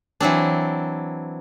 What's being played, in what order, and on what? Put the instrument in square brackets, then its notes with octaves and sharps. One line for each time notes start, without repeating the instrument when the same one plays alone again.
[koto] E3 F#3 C4 D4